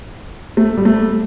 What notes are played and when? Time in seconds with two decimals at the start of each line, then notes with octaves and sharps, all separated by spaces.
0.57 A3
0.77 G3
0.85 A3